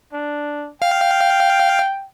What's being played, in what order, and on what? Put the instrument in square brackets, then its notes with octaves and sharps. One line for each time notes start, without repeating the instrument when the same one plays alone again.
[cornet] D4
[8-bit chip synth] F5 [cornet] G5